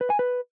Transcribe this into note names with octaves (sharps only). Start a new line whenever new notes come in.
B4
G#5
B4